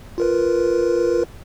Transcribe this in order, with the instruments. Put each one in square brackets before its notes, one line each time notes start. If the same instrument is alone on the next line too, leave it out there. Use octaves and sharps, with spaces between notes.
[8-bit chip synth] F4 A#4 B4